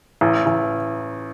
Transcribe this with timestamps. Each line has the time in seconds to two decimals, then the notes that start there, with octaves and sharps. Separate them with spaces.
0.21 A1
0.46 A1